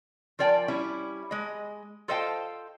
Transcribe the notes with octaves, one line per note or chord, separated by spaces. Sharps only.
F3 A#4 D5 G5 G#5
G3 C#4 E4
G#3 D#5
F4 A4 C5 D#5 F5 G5